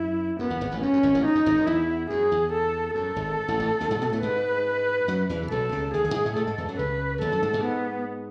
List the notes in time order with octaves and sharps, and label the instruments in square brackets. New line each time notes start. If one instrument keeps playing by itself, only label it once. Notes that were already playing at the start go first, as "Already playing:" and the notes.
Already playing: [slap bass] F#2 [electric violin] E4
[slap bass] F#2 [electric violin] B3
[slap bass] E2
G#1 G#2
A1 A2
[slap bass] F#2 [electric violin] C#4
[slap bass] F#2
G#1 G#2
A1 A2
[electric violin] D#4
[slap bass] F#2
G#1 G#2
F#2
[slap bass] E2 [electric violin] E4
[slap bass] F#2 [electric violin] G#4
[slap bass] E2
[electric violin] A4
[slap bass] F#2 [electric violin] A4
[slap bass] G#1 G#2
A1 A2
A1 A2
D#2 D#3
G#2 G#3
B2 B3
A2 A3
[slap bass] G#2 G#3 [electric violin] B4
[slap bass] F#2 F#3
E2 E3
C#3
[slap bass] B1 B2 [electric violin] A4
[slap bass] C#2 C#3
[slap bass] D#2 D#3 [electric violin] G#4
[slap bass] D#2 D#3
G#2 G#3
A2 A3
[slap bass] A2 A3 [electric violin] A4
[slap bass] G#2 G#3
E2 E3
F#2 F#3
[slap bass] C#2 C#3 [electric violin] B4
[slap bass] D#2 D#3 [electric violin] A4
[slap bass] F#2 F#3
G#2 G#3
G#2 G#3
[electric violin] B3